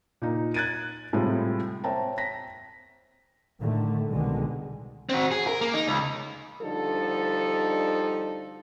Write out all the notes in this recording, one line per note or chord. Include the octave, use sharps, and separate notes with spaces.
A#2 D#4
F#6 G#6 A6 D7 D#7
A2 C3 G3 G#3 E4 F4
C5 C#5 E5 G5 A5 A#5
A#6 B6
A2 D3 D#3 A3
C2 B2 D3 D#3 G#3
C4 F#4
G#4
A#4
A#3
D#4
C#2
D2 D3 F3 G3 D#4 A4